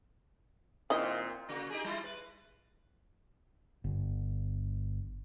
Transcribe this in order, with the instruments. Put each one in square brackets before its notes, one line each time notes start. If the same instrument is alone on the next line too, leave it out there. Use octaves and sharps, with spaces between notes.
[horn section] A#2 C4 [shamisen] D#3 E4 D#5
[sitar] C#3 A#3 F#4
D#4 G4 G#4
G3 E4 F4
B4
[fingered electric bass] G1